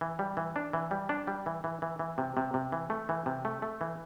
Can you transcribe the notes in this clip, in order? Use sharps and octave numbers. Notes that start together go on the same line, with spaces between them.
E3
G3
E3
D4
E3
G3
D4
G3
E3
E3
E3
E3
C3
C3
C3
E3
A3
E3
C3
A3
A3
E3